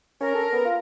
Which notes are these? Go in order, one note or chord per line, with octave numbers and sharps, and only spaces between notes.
C#4 A#4
A4
B3
F4